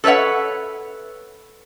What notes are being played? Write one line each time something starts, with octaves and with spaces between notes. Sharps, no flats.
A4 B4 C#5 E5 F#5